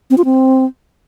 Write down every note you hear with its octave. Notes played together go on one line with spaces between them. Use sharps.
C4
F4
C4